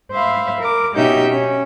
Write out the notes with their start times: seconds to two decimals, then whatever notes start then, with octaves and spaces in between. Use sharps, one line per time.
0.11 C5 E5 F5 B5
0.60 A#4 D6
0.95 B2 C#4 D#4 G4 E5 G6
1.29 C#4